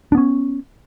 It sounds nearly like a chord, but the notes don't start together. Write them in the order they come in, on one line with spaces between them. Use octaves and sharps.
D4 B3 C#4